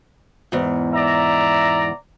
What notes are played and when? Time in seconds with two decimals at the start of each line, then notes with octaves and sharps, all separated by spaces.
0.52 E2 G#2
0.94 D5 E5 A#5